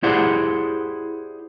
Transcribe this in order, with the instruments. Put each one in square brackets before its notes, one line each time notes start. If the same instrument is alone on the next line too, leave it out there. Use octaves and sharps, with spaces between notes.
[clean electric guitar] E4 G4 G#4 C5 D5 F#5